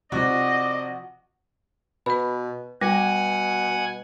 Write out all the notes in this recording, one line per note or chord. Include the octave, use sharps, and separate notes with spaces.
C3 F3 F#4 D5 D#5
B2 B4 B5
B2 G3 F#5 G#5 D6